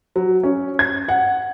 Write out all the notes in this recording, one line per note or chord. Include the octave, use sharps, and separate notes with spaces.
F#3
C#4
G#6
F#5